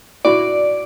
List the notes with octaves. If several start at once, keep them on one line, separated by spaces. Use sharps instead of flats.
E4 F#4 D5